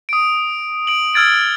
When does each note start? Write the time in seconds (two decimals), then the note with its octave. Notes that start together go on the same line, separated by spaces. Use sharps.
0.09 D#6 D7
0.87 D7 F#7
1.14 E6 F6 G#6 A6 D7 F#7